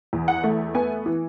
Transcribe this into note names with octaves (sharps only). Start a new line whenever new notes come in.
E2
F#5
A3
B3 G#5
E3